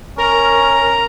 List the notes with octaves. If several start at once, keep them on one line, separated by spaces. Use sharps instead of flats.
C#4 A#4 A#5